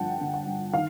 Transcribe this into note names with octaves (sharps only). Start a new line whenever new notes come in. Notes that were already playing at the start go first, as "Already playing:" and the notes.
Already playing: G2 D3 F3 F#5 G5 A5
D3
F#5
G2
D#3 F5